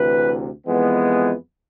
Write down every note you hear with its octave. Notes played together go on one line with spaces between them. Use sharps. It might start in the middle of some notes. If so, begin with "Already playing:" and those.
Already playing: D2 C3 E3 B4
F2 E3 G#3 B3